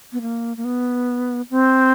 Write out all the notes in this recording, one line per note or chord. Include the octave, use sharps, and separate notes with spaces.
B3
A#3
A#3
B3
C4